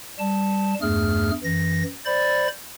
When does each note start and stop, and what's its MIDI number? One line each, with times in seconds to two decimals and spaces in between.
0.19 0.74 55
0.19 0.74 81
0.82 1.31 40
0.82 1.31 43
0.82 1.31 57
0.82 1.31 68
0.82 1.31 89
1.44 1.83 42
1.44 1.83 52
1.44 1.83 94
2.06 2.48 72
2.06 2.48 74
2.06 2.48 83
2.06 2.48 93